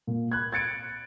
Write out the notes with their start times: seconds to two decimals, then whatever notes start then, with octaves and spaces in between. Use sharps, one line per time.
0.07 A#2
0.32 B5 F#6 G#6
0.52 G#6 A6 C#7 D7